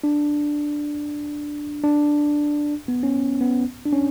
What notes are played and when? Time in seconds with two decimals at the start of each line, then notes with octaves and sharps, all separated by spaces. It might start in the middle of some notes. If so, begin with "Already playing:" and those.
0.04 D4
1.84 D4
2.88 B3
3.03 C#4
3.41 B3
3.86 D4
3.93 C#4